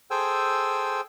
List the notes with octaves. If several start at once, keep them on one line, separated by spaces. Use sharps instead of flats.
G#4 A4 C5 G5 G#5 E6